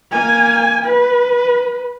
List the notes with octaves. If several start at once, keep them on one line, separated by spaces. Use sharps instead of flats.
A#3 G#5
B4